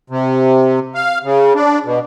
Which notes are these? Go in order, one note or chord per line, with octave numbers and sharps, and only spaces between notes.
C3
F5
C#3
D4
B2